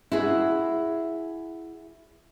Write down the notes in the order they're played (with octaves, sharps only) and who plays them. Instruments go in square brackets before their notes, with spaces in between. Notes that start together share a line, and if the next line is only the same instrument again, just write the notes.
[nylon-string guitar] E4 F#4 G#4